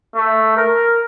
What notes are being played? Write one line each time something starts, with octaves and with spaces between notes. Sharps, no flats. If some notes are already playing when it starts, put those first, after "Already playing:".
A3
A#4